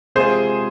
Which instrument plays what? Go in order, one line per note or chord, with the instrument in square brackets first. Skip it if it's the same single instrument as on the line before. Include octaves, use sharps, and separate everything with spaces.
[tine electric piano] C3 G#3 C4 F4 [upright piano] G#4 C5